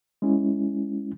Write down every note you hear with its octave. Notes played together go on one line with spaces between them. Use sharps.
G#3 C#4 E4